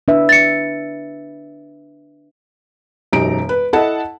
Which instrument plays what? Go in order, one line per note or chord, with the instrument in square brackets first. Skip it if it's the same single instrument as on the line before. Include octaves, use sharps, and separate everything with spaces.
[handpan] D4 B4 E5
[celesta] A6 C#7
[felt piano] E1 F#2 D#4 G4 A#5 D7
B4
E4 A4 D#5 F#5 A5